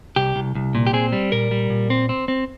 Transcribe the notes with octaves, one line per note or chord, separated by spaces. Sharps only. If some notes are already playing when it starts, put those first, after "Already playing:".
C2 G4
C2
C2
A#2
G4
C4 G#4
G3
A#2 A#4
G3
A#2
C4
C4
C4